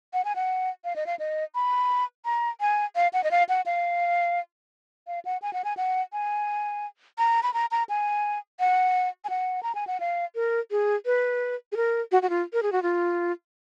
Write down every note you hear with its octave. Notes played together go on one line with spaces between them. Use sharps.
F#5
G#5
F#5
F5
D#5
F5
D#5
B5
A#5
G#5
F5
F#5
D#5
F5
F#5
F5
F5
F#5
G#5
F#5
G#5
F#5
G#5
A#5
B5
A#5
A#5
G#5
F#5
G#5
F#5
A#5
G#5
F#5
F5
A#4
G#4
B4
G#4
A#4
F#4
F#4
F4
A#4
G#4
F#4
F4